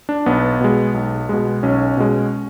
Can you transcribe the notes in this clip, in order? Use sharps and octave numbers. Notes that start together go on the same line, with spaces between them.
D4
B1 B3
B2 G#3
B1
B2 G#3
B1 C#4
B2 G#3